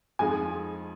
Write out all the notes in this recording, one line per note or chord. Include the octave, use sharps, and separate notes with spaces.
F2 F3 G#3 D#4 G#5